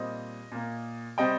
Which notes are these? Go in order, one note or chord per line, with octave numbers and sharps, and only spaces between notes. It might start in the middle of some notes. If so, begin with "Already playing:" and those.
Already playing: A#2 G3 C4 D#5
A#2 A#3
C3 G3 C4 D#5 G5